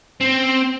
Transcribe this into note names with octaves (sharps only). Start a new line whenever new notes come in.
C4